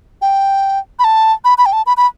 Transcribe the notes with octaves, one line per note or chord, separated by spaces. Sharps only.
G5
B5
A5
B5
B5
G5
A5
B5
B5